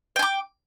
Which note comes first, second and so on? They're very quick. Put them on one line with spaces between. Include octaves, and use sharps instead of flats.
G5 G#5 D6